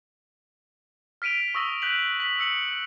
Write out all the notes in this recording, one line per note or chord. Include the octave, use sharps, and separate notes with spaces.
F6 B6 D7 D#7 F7
C#6 D#6 E6 A#6 D#7 G7
F#6 G6 B6 F#7
B6 F#7
E6 C#7 F#7